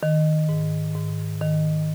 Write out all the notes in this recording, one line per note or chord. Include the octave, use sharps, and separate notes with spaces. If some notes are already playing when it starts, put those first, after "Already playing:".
D#3
G#2
G#2
D#3